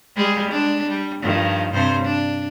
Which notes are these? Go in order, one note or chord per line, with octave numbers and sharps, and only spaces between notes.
G3 G#3 G#4
G#3 D4
G3
G2 D#3 F3
G2 C3 C5
D4